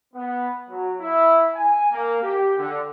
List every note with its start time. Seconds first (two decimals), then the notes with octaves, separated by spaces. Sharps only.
0.14 B3
0.69 F#3
1.00 E4
1.54 G#5
1.91 A#3
2.22 G4
2.57 D3